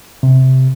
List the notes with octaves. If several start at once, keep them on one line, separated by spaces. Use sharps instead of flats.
C3